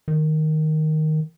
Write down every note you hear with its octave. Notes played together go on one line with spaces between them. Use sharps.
D#3